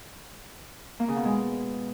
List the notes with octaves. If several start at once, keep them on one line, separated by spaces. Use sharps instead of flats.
A#3
C#3
B2
G#3